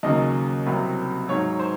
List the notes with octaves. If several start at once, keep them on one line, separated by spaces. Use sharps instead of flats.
D#2 C#3 F#3 D#5
C2 C3 F#3
G#2 F#3 C#5
C5